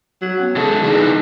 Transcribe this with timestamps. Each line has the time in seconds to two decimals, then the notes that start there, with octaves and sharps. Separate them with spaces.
0.22 F#3
0.37 B3 C#4 F#5
0.56 C#3 G#3 A4
0.82 E3 G3 D4 D#4 G#4
0.94 D#5 A5